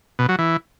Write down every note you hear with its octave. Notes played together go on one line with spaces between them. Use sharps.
B2
F#3
E3